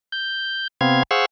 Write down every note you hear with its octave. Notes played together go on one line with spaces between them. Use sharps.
G6
C3 B3 C4 F5 G#6
G#4 C5 F5 F#5 C#6 E6